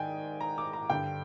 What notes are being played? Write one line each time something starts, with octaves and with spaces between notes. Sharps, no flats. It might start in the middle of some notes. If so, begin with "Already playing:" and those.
Already playing: G#2 D#3 D5 D#5 G5 G#5
A#5
D6
A#5
G2 D3 G5